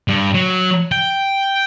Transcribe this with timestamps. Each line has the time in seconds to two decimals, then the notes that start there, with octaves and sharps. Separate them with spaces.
0.08 G2
0.34 F#3
0.92 G5